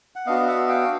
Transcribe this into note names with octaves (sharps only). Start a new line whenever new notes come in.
F#5
B3 D4 F#4 D#5 F5
E5 F#5
F5 G5